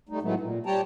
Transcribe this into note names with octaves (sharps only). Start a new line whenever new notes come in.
G3 A3 D#4
A2 D#3 F#3 G#3 A3 B3
A#2
G3 G4 C#5 G5 A5 A#5